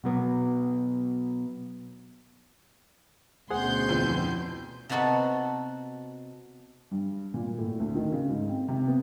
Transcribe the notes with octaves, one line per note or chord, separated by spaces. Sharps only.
B2 F#3 B3
D2 B2 C#4 G#4 C5 F#5 C6 G6
F2 E3
C3 B3 D#4 F#4 A4 B4
G2
A#2
A2
D2
D#3
C#3
G#2
C4
C3
B3